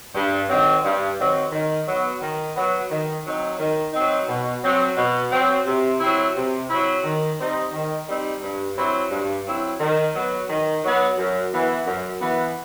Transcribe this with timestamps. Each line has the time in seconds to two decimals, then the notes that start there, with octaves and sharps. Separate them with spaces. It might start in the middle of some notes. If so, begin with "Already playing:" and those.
0.14 G2
0.49 D#3 F#3 C4
0.83 G2
1.18 D#3 F#3 C4
1.52 D#3
1.87 F#3 B3
2.21 D#3
2.55 F#3 B3
2.90 D#3
3.25 F#3 C4 D#4
3.59 D#3
3.93 F#3 C4 D#4
4.28 B2
4.63 F#3 C4
4.97 B2
5.31 F#3 C4
5.66 C3
6.00 F#3 C4 E4
6.35 C3
6.69 F#3 C4 E4
7.04 D#3
7.38 G3 C4 D#4
7.72 D#3
8.07 G3 C4 D#4
8.41 G2
8.76 F#3 C4 E4
9.11 G2
9.45 F#3 C4 E4
9.80 D#3
10.14 F#3 B3
10.48 D#3
10.83 F#3 B3
11.17 F#2
11.52 E3 B3
11.86 F#2
12.20 E3 B3